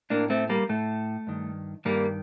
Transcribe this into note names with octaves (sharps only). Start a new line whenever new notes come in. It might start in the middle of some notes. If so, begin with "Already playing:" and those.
A2 A#3 D4
A3 C4
G3 A#3
A2 A3
G2 D#3
G2 D#3 G3 A#3